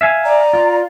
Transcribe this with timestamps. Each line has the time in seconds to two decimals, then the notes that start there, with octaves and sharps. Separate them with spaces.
0.01 E5 F5 G#5
0.25 D5 A#5
0.53 F4